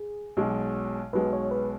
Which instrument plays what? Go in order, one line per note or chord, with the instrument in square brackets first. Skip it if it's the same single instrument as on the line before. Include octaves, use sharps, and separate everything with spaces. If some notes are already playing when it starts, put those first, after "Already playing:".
Already playing: [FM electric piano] G#4
[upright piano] B1 B2 G#3
[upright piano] B1 B2 G#3 [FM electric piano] B4
[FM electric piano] C#5
B4